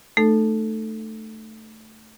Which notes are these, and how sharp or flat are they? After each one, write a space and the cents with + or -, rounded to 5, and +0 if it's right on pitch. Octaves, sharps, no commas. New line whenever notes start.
A3 +0 D#4 -30 A4 +0